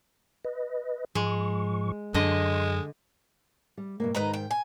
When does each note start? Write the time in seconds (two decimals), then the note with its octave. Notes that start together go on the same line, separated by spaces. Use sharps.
0.45 B4 D#5
1.15 G#2 F3 G#3 C#6
2.14 F#2 D3 G#3 D#5 C6
3.78 G3
4.00 G2 B2 A#3
4.15 G#2 D#3 B4 D#5 A#5
4.34 G5
4.51 G#5